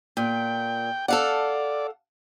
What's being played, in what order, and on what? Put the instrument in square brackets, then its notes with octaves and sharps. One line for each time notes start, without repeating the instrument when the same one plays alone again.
[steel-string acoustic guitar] A#2 [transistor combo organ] G5
[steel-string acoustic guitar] A4 F5 F#5 [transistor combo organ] D5